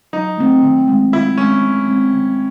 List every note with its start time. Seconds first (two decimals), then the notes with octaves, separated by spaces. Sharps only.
0.13 F#3 D#4
0.38 A3 C4
0.63 D#3
0.88 G#3 C4
1.13 D#3 E4
1.38 G#3 C4 C#4
1.63 D#3
1.88 G#3 C4
2.13 D#3